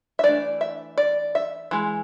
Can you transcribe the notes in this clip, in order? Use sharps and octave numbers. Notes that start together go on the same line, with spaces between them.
E5
E3 A3 D4 D5
E5
D5
E5
E3 G#3